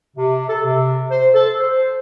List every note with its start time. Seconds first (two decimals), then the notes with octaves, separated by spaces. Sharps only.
0.16 C3
0.48 A4
0.65 C3
1.10 C5
1.34 A4
1.60 C5